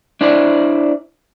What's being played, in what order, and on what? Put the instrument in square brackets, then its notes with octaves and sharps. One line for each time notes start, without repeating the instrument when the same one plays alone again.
[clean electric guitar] D4 E4 C5 D5